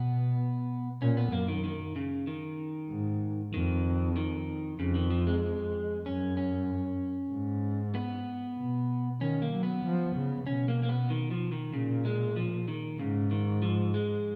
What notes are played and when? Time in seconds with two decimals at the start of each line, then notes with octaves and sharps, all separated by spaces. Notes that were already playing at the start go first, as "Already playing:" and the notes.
Already playing: B2 B3
1.02 A#2 C#4
1.17 B3
1.32 F#2 A#3
1.48 D#3
1.64 D#3
1.96 C#3
2.27 D#3
2.90 G#2
3.53 F2 D#3
4.17 D#3
4.79 F2 C#3
4.95 D#3
5.10 F3
5.27 G#3
6.05 F#2 C#4
6.37 C#4
7.31 G#2
7.95 B3
8.57 B2
9.20 D#3 C#4
9.42 A#3
9.52 F#3
9.63 B3
9.85 F3
10.16 C#3
10.47 B2 C#4
10.68 A#3
10.83 A#3
10.89 B3
11.10 D#3
11.31 F3
11.52 D#3
11.73 A#2 C#3
12.05 G#3
12.36 F3
12.68 D#3
12.99 G#2 C#3
13.31 D#3
13.62 F3
13.94 G#3